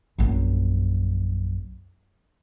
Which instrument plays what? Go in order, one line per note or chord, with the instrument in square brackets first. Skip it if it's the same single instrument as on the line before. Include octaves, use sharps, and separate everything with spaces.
[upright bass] A#1 F#2